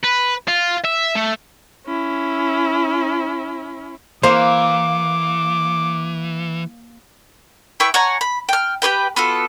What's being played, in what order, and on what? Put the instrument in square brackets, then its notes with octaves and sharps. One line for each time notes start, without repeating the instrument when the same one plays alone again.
[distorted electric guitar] B4
F4
E5
A3
[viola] C#4 E4
[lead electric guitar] E3 [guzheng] A#3 [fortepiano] C5 [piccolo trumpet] D6
[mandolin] E4 B4 G5 C#6
C#5 F#5 G#5 A#5
B5
G5 F6
G4 G#4 B4 G5
B3 F4 F#4 A4